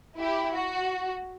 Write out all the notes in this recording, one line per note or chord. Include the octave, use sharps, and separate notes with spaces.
E4 G4
F#4